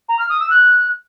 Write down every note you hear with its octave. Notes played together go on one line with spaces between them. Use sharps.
A#5
F6
D#6
E6
F#6